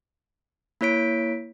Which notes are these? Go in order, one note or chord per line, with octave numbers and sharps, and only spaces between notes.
A#3 E4 C#5 B6 D7